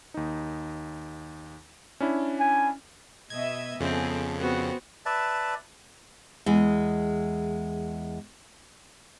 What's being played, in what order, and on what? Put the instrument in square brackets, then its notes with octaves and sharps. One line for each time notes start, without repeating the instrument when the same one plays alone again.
[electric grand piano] D#2 D#4
C#4 D4 E4
[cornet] G#5
[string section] B2 D#5 E5 [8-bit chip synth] G#6
[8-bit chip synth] F2 C#3 [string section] B3 G#4 A4 [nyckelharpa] C4
[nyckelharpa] B3 F#4 [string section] C4
[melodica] B4 D5 E5 A5
[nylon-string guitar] E2 G#3